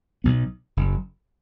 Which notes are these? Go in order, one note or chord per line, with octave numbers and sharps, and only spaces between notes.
B1 B2 B3
F#1 F#2